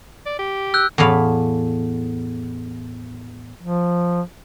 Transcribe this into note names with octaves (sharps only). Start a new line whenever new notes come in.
D5
G4
E6 F#6 G6
E2 A2 A3 F5 B5
F3